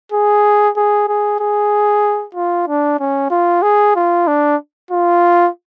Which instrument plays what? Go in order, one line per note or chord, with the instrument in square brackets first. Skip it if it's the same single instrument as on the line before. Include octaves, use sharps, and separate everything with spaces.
[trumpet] G#4
G#4
G#4
G#4
F4
D4
C#4
F4
G#4
F4
D4
F4